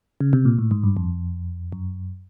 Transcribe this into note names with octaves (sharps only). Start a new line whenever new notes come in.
C#3
C3
A#2
A2
G#2
G2
F2
F#2